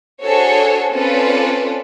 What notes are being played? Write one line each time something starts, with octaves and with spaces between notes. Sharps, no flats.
D4 F#4 G#4 A4 C5 C#5
C4 C#4 F4 A4 B4 D5